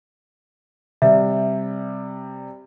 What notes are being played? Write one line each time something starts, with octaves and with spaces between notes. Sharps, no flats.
C3 G3 E5